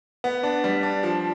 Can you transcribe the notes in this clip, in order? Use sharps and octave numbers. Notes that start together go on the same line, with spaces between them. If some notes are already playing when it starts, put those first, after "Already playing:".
B3
D4
G3
D4
F3